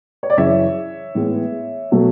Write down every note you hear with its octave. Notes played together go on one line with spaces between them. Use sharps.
C#5
D5
F#2 C#3 E3 C#5 E5
A2 E3 G#3 B3
B2 F#3 A3